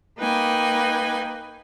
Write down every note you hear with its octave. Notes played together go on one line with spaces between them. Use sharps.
A#3 D#4 B4 G5 G#5